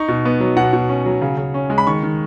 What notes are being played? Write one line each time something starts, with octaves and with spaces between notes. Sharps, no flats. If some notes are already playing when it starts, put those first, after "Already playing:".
Already playing: D#4 C#6
B2
B3
F#3
B2 F#5
B2
C#4
F#3
C#3
C#3
C#4
G#3
B5
D#3 C#6
D#3